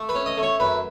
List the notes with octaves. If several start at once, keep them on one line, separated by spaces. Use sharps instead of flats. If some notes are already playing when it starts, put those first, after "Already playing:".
Already playing: A3
B4 B5
C#4
D#5 D#6
A3
C#5 C#6
F#2 B4 B5